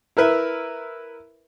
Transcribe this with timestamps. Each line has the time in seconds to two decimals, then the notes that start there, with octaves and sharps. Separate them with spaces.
0.17 E4 A#4 B4 E5